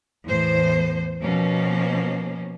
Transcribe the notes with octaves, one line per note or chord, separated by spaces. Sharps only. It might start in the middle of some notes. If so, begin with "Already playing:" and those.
E2 A2 C5
B2 F3 A#3 C#4